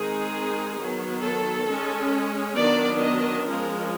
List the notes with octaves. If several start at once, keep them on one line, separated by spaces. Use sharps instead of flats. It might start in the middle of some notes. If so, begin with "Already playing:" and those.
Already playing: D#3 G#3 C4 D#4 G#4
D#3 F#3 B3
A4
G#3 C#4
D#3 F#3 B3 D4 D5
D#5
F3 G#3 C#4 A#4